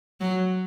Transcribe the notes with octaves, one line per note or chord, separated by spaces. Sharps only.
F#3